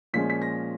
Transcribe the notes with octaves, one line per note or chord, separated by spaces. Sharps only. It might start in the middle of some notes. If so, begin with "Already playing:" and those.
A#2 F3 G#3 C#4 B6
B6
A#6